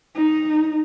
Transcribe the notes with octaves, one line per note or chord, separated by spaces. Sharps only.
D#4